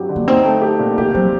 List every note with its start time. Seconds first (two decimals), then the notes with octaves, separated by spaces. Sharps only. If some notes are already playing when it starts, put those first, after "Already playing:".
Already playing: G2 F#3 C4 G4
0.09 D3
0.16 A#3
0.28 C4 D#4
0.45 A3
0.62 G4
0.79 A#2
0.98 D3 G4
1.15 F#3 C4